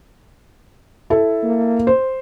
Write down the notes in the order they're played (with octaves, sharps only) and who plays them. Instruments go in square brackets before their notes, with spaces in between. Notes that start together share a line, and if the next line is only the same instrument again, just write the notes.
[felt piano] E4 A4
[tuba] A#3
[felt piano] C5